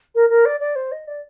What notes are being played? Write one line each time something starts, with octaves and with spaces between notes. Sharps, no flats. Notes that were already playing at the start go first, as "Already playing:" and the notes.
A#4
A#4
D5
D5
C5
D#5
D5